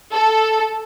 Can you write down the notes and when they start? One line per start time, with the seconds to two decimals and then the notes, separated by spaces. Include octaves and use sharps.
0.12 A4